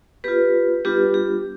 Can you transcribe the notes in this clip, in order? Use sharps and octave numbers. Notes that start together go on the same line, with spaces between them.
B3 F4 G4 B4
G3 B3 D4 F4 G4 B4
G4